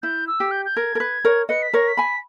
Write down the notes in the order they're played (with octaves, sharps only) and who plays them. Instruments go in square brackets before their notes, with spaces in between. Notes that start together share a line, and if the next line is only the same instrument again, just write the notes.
[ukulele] E4 [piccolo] G6
[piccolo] E6
[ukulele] G4
[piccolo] G6
G6
[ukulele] A#4 [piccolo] G#6
[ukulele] A#4
B4
A#4 C#5
[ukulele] B4 D#5 [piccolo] C#7
[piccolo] B6
[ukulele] A#4 C#5 [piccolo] A#6
[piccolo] B6
[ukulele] G#5 B5